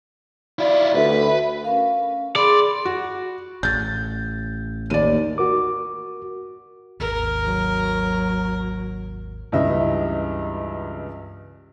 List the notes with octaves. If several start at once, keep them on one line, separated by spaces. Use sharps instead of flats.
E4 F4 D5
D2 B4 E5
C#4 A#4 F5
G#4 D5 B5 C6
F#4
A1 G6 A6
D#2 D5 D#7
F#4 A#4 D6
G#1 D#2 A#4
F#3
C#2 G2 E3 D#5 E5